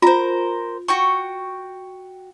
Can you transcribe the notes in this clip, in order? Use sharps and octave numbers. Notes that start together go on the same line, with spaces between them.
F4 A#4 C5
F#4 G5 C#6